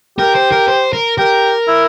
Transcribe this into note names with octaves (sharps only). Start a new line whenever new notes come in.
G4 A#4
C5
A#4
C5
A#4
G4 A#4
E4